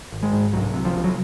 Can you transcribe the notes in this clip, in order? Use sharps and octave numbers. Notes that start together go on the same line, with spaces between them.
G#1
G#3
G#2
C2 F#3
C3
F3
C2
F#3